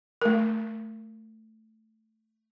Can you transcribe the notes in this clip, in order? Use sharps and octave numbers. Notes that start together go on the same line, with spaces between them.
A3 A#4